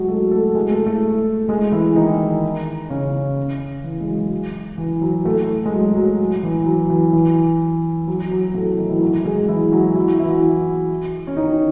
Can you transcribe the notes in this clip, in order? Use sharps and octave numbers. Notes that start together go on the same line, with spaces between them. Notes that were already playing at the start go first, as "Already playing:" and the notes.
Already playing: F#3 G#3 F#4 G#4
A3 A4
A3 A4
G#3 G#4
A3 A4
A3 A4
G#3 G#4
E3 E4
D#3 D#4
C#3 C#4
E3
G#3
F#3
E3
F#3
A2 A3
G#3
F#3
F#3
E3
F#3
E3
E3
F#3
F#3
A2 A3
F#3
D#3 D#4
E3 E4
F#3 F#4
G#3 G#4
E3 E4
F#3 F#4
E4
F#4
E3 E4
C#4
D#3 D#4